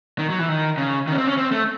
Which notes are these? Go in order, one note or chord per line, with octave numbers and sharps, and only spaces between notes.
D#3
F#3
E3
D#3
C#3
D#3
C#4
C4
C#4
C4
A3